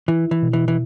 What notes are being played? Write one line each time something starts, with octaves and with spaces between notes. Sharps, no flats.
E3 E4
E3
B2
E3
E3